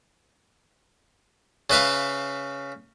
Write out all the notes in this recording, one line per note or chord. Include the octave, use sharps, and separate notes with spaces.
C#3 B4 E5 F5